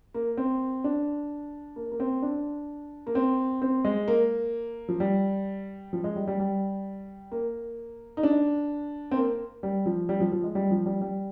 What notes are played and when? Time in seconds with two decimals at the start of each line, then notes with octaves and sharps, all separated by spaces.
0.14 A#3
0.37 C4
0.84 D4
1.76 A#3
1.92 A#3
2.00 C4
2.22 D4
3.07 A#3
3.15 C4
3.62 C4
3.85 G#3
4.08 A#3
4.89 F3
5.00 G3
5.93 F3
6.04 G#3
6.16 G3
6.27 G3
6.40 G3
7.32 A#3
8.17 D#4
8.23 D4
9.11 C4
9.17 A#3
9.63 G3
9.86 F3
10.09 G3
10.20 F3
10.32 F3
10.44 G#3
10.55 G3
10.71 F3
10.86 G3
11.01 G3